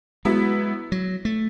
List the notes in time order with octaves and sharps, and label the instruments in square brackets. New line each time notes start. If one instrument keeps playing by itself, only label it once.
[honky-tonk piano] F#3 B3 E4 [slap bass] G#3
[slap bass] F#3
A3